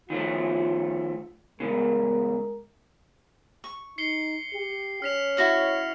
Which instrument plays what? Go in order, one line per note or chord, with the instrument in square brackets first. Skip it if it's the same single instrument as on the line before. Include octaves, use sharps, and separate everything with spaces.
[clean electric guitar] D#3 F3 A3 [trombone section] F4
[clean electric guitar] E2 A#2 C#3 [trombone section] G#3 A#4
[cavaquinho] C#6
[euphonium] D#4 [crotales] C7 C#7 G7
[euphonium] G4
[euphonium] C#4 [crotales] F6 B6 F7
[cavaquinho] E4 F#4 C#5 [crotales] F6